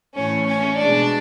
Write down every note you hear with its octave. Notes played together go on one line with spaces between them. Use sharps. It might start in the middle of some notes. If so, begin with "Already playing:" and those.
A2 E3 A3 C#4 C#5
C#4 C#5
B2 G#3 D4 D5